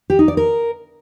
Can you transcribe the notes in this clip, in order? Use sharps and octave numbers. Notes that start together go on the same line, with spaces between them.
G4
D#4
D5
A#4